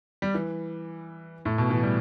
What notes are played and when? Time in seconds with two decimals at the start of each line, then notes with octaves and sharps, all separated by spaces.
0.22 G3
0.35 E3
1.45 A2
1.58 B2
1.70 E3
1.83 G3